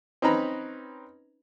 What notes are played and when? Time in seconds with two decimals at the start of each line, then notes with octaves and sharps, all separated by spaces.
0.22 C4 C#4 D#4 B4 A#5 B5